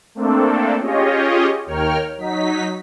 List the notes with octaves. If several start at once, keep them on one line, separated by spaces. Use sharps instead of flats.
A3 A#3 C4 D4 A4
C#4 F4 G4 G#4 C#5 D#5
D#2 A#4 C#5 G5 F6
F#3 D#4 B6